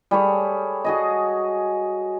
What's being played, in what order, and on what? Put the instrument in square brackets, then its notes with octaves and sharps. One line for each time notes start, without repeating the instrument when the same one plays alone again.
[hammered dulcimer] G3 G#4 A4 C#5
F#4 G#4 D#5